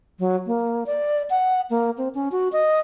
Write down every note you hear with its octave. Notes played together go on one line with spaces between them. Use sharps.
F#3
A#3
D5
F#5
A#3
C4
C#4
F#4
D#5